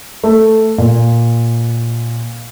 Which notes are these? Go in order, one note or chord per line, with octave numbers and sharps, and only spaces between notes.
A3
A#2